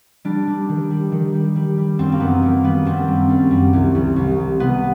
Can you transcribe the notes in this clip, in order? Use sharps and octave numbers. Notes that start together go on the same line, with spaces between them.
G3 D4
G3
D#3
G3
D#3
G3
G3
G3
F#2 C4
A#3
D#3 B3
D#3 A#3
G3 B3
F#2 C4
G3
F#2
G3
C2
C2
C2
C2
C3 B3